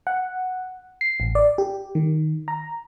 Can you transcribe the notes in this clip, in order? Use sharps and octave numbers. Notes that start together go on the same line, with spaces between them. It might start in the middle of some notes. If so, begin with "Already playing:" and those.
F#5
C7
A1
D5
G4
D#3
A#5